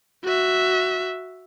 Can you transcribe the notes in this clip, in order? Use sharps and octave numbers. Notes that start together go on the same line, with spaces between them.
F#4 E5